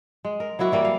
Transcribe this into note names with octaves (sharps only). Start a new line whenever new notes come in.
G#3
A#4
F#3 A#3 E4 F#4
E3 G3 A#3
F5